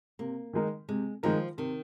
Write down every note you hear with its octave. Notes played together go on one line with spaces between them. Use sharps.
C3 A#3
D#3 G#3 D#4 A#4
C3 G#3
D#3 F3 G#3 D#4 A#4
C3 D#3